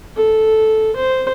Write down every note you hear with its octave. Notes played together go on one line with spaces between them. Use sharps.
A4
C5